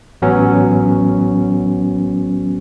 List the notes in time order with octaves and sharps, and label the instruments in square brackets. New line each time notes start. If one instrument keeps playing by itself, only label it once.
[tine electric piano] A1 F#3 B3 C#4